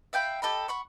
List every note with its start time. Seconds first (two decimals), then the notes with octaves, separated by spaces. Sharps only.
0.13 E5 F5 G5 B5
0.42 G4 A4 D#5 B5
0.68 F#5 B5 C#6